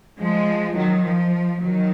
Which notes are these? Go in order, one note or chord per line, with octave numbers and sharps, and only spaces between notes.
F3 G#3
D#3 F#3
F3
D#3 F#3